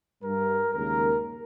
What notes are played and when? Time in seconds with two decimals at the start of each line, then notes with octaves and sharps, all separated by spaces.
0.23 G2 G3 A#4
0.74 D#2 C#3 G#3 A#4